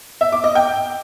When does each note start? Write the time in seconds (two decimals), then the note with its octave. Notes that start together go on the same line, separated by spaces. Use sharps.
0.21 E5
0.32 D6
0.44 D#5
0.55 G5